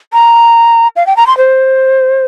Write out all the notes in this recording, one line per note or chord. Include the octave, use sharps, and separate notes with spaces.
A#5
F5
G5
A#5
C6
C5